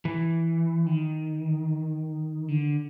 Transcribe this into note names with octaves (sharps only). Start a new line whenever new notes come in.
E3
D#3
D3